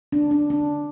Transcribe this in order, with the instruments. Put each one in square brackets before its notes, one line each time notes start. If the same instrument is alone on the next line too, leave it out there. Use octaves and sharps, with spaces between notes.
[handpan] D4
D4
D4